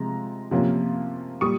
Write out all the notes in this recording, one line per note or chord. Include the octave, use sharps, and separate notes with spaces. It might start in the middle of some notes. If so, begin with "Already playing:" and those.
Already playing: C3 F3 G#3 A#5
C3 F3 A#3 C#4
A#2 G3 C#6 D#6